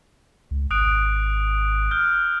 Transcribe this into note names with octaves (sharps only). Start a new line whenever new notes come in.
C#2
G#1 D#6 F#6 D7
F6 G6